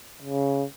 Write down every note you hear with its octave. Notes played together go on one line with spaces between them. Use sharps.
C#3